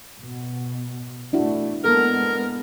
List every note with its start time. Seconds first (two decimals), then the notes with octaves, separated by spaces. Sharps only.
0.18 B2
1.33 B2 A3 D4 E4 F#4
1.85 G#3 A#3 B3 A4 A#4